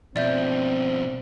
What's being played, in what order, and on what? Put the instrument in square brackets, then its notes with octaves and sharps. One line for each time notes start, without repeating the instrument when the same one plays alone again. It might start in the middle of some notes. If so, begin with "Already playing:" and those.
[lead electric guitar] B2 F3 [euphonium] C4 [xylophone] D5 E5 G6